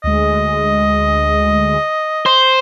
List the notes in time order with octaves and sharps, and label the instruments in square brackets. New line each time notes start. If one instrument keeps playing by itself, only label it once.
[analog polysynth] D2 G#3 [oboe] D#5
[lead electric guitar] C5